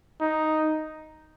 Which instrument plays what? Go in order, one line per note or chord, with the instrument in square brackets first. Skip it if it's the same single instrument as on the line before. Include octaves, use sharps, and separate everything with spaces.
[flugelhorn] D#4